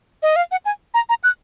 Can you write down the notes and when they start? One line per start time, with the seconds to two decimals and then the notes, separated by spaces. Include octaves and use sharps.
0.23 D#5
0.36 F5
0.51 F#5
0.65 G#5
0.94 A#5
1.09 A#5
1.24 F#6